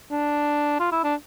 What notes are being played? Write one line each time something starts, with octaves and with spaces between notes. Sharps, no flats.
D4
F4
E4
D4